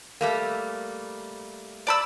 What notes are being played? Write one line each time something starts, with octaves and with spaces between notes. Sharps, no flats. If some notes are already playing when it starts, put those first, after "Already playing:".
G3 A3 A#3
D5 B5 E6